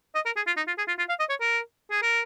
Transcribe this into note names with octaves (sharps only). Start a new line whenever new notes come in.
D#5
A#4
G#4
F4
D#4
F4
G#4
F4
F4
F5
D#5
C#5
A#4
G#4
A#4